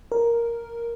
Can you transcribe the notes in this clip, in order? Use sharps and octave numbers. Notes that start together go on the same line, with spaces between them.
A#4